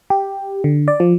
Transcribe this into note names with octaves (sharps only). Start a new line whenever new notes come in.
G4
D3
D5
F3